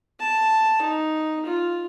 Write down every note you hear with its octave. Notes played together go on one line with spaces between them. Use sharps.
A5
D#4
F4